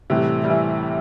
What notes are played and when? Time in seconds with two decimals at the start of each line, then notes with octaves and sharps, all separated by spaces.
0.10 A2 C3 E3 G3
0.44 G3
0.50 E3